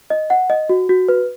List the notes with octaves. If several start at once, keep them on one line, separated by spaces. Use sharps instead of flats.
D#5
F#5
D#5
F#4
F#4
B4